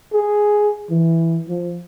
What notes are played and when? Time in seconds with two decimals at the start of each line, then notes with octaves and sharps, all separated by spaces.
0.13 G#4
0.90 E3
1.49 F3